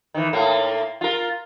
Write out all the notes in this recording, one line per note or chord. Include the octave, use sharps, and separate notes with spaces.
D#3 E3
A2 A#3
F4 A#4